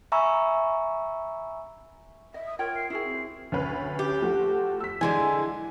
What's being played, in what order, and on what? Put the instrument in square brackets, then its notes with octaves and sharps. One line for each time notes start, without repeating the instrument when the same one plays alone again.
[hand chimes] E5 G#5 A#5 B5 C#6 E6
[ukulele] D#5 [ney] E5
[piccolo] D#6
[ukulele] F4 C#5 G5 [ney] A#4 [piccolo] G#6
[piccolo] C7
[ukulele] E4 F#4 G#4 [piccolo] C7
[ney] C4
[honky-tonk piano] D2 C#4 B4
[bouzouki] G4
[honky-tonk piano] F3 A3 F#4
E6 B6
[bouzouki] D3 G#3 G#5 [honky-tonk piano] E3